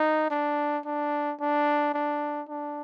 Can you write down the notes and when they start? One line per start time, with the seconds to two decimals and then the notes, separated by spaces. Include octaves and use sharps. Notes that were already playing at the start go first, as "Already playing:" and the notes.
Already playing: D#4
0.31 D4
0.85 D4
1.40 D4
1.94 D4
2.49 D4